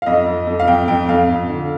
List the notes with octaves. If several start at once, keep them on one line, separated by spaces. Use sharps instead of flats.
F5
F2 D#5
F2
F2
F5
F2 G5
F2 G5
F2 F5
F2
D3